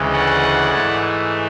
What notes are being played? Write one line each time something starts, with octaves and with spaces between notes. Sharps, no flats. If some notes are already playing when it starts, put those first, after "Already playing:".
Already playing: D2 C#3 E3 G#3
D5 F#5
G#2 E3 A3